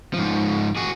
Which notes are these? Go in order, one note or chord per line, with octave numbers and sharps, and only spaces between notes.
G#2 F3
F#4 G#4